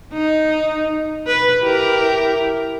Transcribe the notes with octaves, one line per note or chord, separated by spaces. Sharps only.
D#4
B4
E4 G4 A#4